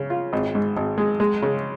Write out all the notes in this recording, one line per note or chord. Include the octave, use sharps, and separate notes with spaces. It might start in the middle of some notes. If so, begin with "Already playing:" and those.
Already playing: C#3
F4
G#1
G#2
G#1
G#3
G#3
C#3